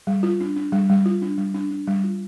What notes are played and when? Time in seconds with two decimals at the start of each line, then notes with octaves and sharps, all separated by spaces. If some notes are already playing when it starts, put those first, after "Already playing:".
0.07 G3
0.23 F4
0.41 D4
0.56 D4
0.72 G3
0.89 G3
1.06 F4
1.22 D4
1.38 G3
1.54 D4
1.71 D4
1.87 G3
2.04 F4